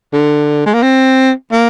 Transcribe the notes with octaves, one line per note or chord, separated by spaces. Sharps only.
D3
G#3
A#3
C4
A#3